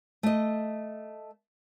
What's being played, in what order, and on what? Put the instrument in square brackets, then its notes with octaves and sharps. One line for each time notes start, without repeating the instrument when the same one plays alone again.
[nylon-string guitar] A3 D#5